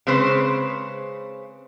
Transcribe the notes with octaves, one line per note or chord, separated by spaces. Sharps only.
C#3 G#3 C4 B4 C5